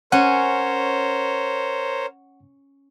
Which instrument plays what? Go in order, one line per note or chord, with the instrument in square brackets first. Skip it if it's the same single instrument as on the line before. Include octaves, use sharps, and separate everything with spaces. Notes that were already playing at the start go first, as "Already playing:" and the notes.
[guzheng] C#4 [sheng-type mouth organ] A#4 C5 C#5 [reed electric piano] F#5